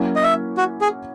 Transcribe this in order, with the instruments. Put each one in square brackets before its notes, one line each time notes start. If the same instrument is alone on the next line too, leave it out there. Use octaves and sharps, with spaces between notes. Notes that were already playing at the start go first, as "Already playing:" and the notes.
Already playing: [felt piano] F#3 A#3 C#4 E4
[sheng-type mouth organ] D#5
E5
F#4
G#4